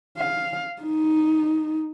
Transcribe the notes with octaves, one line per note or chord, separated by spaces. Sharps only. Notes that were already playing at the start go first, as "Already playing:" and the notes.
F5
D#4